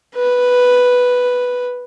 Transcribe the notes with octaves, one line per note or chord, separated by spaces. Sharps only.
B4